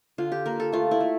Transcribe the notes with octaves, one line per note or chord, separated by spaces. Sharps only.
D3 F4
G4
A#3 A#4
A4
A3 F4
E4
A3